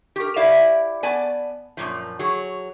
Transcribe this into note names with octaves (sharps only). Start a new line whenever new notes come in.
G4 A#4
E4 G4 D5 E5 F5
B3 D5 G#5 A5
F#2 A#2 F3
F#3 G#4